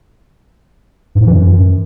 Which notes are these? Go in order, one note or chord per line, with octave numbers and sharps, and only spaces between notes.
G2
G#2
E3
F#2